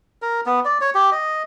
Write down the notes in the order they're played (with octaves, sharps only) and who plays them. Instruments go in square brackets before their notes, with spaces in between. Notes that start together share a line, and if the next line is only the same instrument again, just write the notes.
[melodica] A#4
B3
D5
C#5
G4
D#5